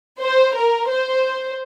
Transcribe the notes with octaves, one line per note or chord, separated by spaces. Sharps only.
C5
A#4
C5